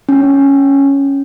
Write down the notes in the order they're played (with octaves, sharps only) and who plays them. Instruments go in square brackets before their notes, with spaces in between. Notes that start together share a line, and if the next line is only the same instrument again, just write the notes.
[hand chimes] C#4